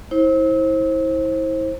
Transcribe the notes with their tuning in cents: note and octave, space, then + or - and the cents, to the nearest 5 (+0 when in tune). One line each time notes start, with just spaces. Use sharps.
E4 -35 C5 +25